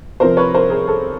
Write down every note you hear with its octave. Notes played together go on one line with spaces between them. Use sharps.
C3 F3 A#4 C5
B4 C#5
A#4 C5
G#4 A#4
A4